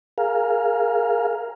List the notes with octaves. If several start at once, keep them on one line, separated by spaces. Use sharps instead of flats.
G#4 A#4 F5